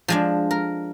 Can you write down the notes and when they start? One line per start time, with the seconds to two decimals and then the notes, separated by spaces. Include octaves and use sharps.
0.08 F3 G#3 D4
0.51 A#4